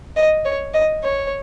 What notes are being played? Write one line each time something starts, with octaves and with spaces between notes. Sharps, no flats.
D#5
C#5
D#5
C#5